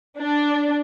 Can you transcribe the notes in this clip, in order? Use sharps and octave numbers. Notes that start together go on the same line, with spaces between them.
D4